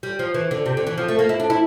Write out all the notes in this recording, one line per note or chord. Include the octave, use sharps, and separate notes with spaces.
G3
F3
E3
D3
C3
D3
E3
F3
A3
A#3
E4
D4
E4